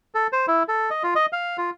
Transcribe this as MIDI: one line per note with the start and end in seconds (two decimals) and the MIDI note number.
0.15 0.27 69
0.32 0.46 72
0.48 0.63 64
0.68 0.90 69
0.90 1.03 75
1.03 1.14 65
1.15 1.26 75
1.33 1.57 77
1.58 1.70 65